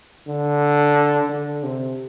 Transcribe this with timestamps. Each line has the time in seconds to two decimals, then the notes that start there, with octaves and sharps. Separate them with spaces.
0.27 D3
1.29 D3
1.63 C3